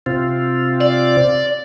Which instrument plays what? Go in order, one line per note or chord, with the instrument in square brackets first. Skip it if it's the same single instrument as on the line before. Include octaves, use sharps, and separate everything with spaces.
[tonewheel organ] C3 C4 F4
[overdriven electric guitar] D5